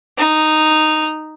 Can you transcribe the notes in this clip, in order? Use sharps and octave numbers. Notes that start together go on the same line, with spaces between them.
D#4